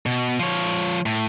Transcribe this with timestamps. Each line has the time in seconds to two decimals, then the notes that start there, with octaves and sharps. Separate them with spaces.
0.06 B2
0.39 F3 C#5
1.06 A2